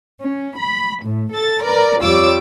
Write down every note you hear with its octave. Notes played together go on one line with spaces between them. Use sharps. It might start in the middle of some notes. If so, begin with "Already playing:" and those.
C#4
B5
A2
A4 A6
A#4 B4 D5
F2 G3 F4 C#5 D6 E6